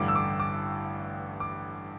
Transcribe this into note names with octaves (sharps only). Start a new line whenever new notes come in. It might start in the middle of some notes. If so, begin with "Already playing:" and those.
Already playing: A1 G2 D3 D6
E6
D6
D6
D6